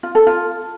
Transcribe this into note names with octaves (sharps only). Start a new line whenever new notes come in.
F4
A4
F4